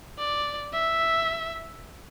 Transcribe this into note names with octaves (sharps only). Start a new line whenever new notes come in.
D5
E5